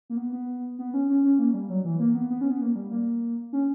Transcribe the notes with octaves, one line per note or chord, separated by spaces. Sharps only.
A#3
B3
B3
B3
C#4
C#4
C#4
A#3
G3
F#3
E3
A#3
B3
B3
C#4
B3
A#3
G3
A#3
C#4